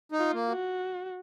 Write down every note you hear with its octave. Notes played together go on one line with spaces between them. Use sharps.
D#4
F4
A#3
F#4